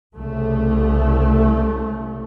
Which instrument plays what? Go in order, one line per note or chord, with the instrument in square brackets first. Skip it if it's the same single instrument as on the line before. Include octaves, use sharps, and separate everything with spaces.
[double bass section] C2 C#3 A3